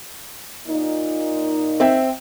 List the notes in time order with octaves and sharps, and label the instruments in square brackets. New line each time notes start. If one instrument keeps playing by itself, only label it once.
[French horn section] A#2 D#4
[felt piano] C4 E5 G5